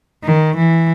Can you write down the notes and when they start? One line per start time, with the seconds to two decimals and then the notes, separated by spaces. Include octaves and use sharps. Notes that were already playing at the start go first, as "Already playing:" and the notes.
0.24 D#3
0.56 E3